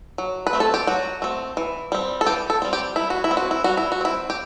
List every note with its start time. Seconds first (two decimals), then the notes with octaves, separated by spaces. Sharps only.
0.18 F#3
0.47 B4
0.53 A3 C4
0.60 A4
0.74 G4
0.87 F#3 F#4
1.22 A3 C4
1.57 E3
1.92 G3 C4
2.21 A4
2.26 E3 G4
2.50 A4
2.62 G3 C4
2.73 G4
2.96 G3 E4
3.10 F#4
3.24 E4
3.31 C4
3.37 F#4
3.51 E4
3.64 G3 F#4
3.77 E4
3.92 F#4
4.01 C4 E4
4.30 G4